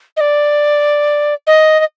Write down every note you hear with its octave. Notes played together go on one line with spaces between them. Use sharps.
D#5
D5
D#5
D#5